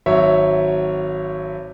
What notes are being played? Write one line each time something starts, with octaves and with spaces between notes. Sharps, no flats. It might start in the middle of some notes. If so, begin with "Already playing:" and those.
G#1 F#3 C#5 E5